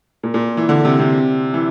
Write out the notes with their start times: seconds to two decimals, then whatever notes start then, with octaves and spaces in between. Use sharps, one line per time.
0.23 A#2
0.34 A#2
0.57 E3
0.69 D3
0.85 C3
0.99 C3
1.54 E3